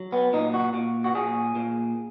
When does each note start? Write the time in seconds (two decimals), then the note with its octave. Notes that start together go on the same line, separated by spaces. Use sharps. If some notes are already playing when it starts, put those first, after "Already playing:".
Already playing: F#3
0.12 B3
0.33 A#2 D#4
0.54 F#4
0.74 A#2
1.04 F#4
1.15 A#2 G#4
1.55 A#2